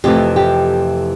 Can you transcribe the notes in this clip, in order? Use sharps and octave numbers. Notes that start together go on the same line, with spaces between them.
F2 C3 E3 A3 G4
G4